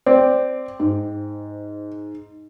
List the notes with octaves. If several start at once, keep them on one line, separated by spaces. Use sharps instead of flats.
C4 D5
G#2